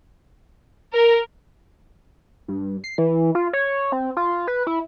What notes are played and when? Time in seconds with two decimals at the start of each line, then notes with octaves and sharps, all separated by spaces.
0.93 A#4
2.48 G2
2.84 C7
2.98 E3
3.35 F4
3.53 C#5
3.92 C4
4.17 F4
4.48 B4
4.67 E4